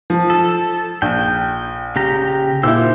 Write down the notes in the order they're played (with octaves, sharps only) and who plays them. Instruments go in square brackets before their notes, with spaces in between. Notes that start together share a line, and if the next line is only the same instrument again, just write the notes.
[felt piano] F3
[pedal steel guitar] A4
[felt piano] A#1 [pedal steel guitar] G5
[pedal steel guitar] C#3 G4 A#5
[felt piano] A#2 E4 [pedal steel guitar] C5 E6